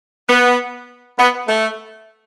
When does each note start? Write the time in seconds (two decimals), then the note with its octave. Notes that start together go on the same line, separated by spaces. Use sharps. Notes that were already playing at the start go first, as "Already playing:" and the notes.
0.28 B3
1.18 B3
1.48 A3